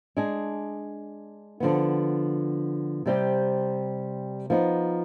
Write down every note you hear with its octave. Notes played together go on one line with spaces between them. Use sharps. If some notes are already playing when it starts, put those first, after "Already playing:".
G#3 D4 G#4
D3 F3 B3
C3 G3 C4 G4
F3 B3 D#4